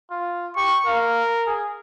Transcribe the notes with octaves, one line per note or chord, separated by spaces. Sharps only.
F4
G4 C#6
A#4 F5
G#4